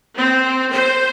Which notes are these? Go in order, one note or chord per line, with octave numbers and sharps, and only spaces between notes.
C4
C5